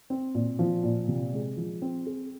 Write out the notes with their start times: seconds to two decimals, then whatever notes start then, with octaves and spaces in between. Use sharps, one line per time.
0.10 C4
0.35 A#2
0.59 F3
0.83 A#2
1.08 C3
1.33 G#3
1.57 F3
1.82 C4
2.06 G#4